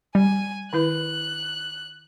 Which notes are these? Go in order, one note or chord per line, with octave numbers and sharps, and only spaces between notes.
G3 G#5
D#3 E4 B4 F#6